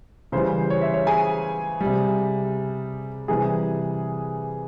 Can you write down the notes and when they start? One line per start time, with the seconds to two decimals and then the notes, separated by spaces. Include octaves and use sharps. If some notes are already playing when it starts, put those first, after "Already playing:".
0.32 C#3 E3 G3 C5
0.70 C#5
0.81 E5
0.94 C#5
1.07 G#4 G#5
1.81 G3
1.86 C3
3.28 C3 E3 G3 G#4 G#5